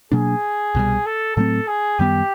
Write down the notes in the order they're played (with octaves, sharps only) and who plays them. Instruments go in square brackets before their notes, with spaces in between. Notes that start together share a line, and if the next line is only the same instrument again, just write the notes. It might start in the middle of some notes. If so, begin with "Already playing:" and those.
[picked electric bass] B2 F#3 A#3 D4 [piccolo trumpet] G#4
[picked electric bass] C2 B2 G3
[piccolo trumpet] A4
[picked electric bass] A2 F#3 A3 C4 [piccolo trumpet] A4
[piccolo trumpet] G#4
[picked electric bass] F#2 D#3 G3 B3 [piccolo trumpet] G4